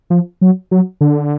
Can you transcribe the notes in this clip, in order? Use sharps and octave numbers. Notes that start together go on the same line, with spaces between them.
F3
F#3
F#3
D3